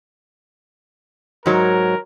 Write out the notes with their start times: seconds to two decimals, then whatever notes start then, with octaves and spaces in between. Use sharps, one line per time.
1.46 G#2 F#3 A#4